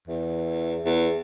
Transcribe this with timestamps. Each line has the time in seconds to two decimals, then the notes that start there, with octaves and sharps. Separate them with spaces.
0.08 E2
0.85 E2